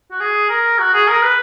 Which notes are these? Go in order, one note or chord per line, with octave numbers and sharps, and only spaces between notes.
F#4
G#4
A#4
F#4
G#4
A#4
B4